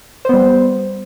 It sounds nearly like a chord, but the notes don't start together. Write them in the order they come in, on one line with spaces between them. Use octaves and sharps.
C5 B3 G3